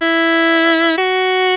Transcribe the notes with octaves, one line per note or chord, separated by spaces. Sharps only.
E4
F#4